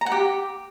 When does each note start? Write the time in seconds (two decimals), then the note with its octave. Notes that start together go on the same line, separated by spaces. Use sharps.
0.01 A#5
0.06 F#5
0.12 G4